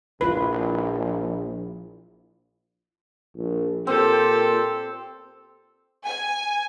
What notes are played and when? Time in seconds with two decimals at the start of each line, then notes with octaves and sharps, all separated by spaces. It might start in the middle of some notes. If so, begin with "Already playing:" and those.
0.21 A#1 F3 E4 F4 B4
3.36 A#1
3.87 A#2 C4 G4 A4
6.05 G#5